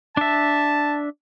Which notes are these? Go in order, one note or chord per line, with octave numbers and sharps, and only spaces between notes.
D4 E5 A5